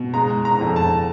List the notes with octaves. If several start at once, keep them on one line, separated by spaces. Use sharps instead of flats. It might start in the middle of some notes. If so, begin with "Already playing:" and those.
Already playing: B2
G#3 A#5
A#5
F2
A5